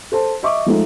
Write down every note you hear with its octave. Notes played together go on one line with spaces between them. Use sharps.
A4 C5 A5
D#5 E5 C#6 D6
F3 G#3 A3 D#4